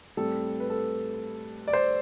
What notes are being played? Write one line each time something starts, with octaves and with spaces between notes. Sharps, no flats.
A2 G3 C4 A4
B4
A4
D5
C5